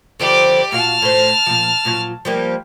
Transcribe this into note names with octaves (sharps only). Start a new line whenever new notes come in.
D3 F3 G3 G4 D5
A#2 F#4 F5 A5 F6
A2 C5
A#2 F3
A#2 F3 F#3
F3 G3 A#3